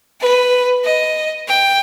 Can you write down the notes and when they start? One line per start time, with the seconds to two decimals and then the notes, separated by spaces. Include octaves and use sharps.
0.21 B4
0.84 D#5
1.48 G5